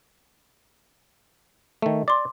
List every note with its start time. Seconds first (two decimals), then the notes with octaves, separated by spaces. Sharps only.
1.82 D#3 A3
2.08 D5 C6 D6